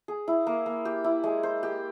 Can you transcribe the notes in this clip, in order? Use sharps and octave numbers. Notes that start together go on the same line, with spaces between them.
G#4
E4
A#3
A#3
G4
E4
G#3
C5
G4